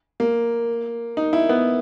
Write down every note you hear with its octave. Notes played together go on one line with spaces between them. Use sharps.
A#3
D#4
E4
B3